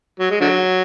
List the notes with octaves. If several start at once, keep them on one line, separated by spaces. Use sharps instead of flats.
F#3
G#3
D3 F#3